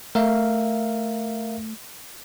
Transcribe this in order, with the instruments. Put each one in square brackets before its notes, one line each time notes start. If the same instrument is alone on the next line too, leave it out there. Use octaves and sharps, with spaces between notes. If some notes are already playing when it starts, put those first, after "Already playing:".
[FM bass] A3 [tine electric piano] A#4 E5 F5